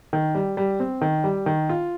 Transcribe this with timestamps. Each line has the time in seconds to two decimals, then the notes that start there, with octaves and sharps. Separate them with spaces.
0.13 D#3
0.35 G3
0.57 G3
0.80 C4
1.01 D#3
1.24 G3
1.46 D#3
1.69 F4